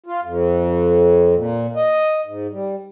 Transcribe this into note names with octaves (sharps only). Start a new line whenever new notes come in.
F4
F2
A#2
D#5
G#2
G3